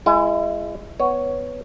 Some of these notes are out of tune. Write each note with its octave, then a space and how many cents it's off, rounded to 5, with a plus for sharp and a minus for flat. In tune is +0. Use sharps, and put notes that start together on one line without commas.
G#3 +0 E4 +35
B3 +5 C#5 +5